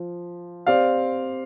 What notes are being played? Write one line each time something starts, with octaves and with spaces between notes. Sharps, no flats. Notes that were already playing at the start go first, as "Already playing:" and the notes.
Already playing: F3
C4 G4 D5 F5